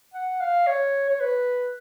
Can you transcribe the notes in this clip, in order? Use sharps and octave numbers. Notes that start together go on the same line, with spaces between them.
F#5
F5
C#5
C#5
B4